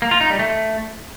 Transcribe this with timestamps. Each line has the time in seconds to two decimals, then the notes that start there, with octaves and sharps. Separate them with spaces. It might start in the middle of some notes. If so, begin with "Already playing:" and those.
0.02 A#3
0.11 F4
0.21 D#4
0.30 G3
0.39 A3